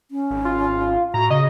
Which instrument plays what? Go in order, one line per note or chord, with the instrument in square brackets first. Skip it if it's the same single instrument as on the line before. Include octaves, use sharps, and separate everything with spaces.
[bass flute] C#4
[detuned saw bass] G#1
[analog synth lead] F4
[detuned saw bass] A2 [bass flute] F#4 [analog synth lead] A#5
[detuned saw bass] C#3 [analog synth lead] D#5